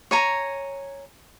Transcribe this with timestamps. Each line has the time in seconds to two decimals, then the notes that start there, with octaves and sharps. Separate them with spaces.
0.11 C#5 G#5 A#5